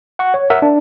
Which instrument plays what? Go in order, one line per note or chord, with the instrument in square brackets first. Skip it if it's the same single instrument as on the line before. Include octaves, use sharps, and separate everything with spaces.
[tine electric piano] F#5 C#6
C#5
A#4 E5 F#5
D4